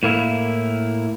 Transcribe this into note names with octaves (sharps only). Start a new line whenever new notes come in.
A2 A#3 E4